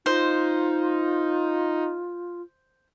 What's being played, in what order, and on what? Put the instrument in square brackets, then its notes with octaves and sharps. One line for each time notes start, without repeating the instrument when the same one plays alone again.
[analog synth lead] D#4 [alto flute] F4 [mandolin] C5